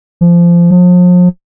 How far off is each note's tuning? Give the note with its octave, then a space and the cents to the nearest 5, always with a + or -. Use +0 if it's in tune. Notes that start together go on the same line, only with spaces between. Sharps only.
F3 -20
F3 +40